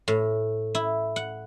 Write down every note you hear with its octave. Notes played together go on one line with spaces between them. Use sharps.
A2
E4
F#5